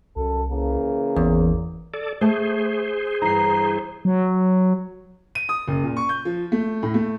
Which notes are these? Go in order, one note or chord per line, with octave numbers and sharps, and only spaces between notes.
C2 F#2 A4
C#3 E3 A#3
G#1 E2
A4 D5
A3 G#4 C5 A5
G2 E3 E4 A#5 C7
F#3
D#7
D#6
F#1
A#2
C#6
G6
F3
A3
A2
A3